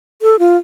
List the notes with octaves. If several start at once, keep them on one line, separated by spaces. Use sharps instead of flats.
A4
F4